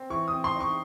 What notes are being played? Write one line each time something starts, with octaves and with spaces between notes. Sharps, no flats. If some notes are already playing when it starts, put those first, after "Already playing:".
Already playing: C4
E3 C#6
C4 D#6
C6
D#4
C#6